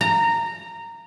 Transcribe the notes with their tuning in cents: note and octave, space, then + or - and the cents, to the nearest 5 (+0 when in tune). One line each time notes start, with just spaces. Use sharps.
A#5 -15